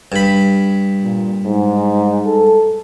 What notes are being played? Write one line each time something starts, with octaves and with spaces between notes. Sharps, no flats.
G2 B5
A#2
G#2
A4